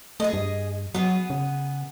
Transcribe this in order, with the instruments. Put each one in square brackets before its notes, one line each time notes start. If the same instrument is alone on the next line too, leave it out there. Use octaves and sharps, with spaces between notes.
[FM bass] A3 [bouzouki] G#4 D#5
[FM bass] G2
[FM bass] F#3 [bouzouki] B3 G#4
[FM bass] C#3